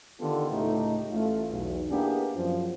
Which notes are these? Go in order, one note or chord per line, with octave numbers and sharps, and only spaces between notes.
D3 D#3 B3 F4 G4 A4
C#2 A2 A3 D#4 G4
A1 A3 F4
B1 E2
A#3 B3 D4 E4 G4 G#4
F#2 F3